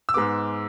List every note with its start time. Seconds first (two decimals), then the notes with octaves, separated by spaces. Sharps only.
0.09 E6
0.14 G#2 G#3 B3 D6